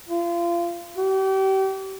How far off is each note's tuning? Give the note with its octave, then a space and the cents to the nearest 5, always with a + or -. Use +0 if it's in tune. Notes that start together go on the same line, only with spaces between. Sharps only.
F4 -30
G4 -35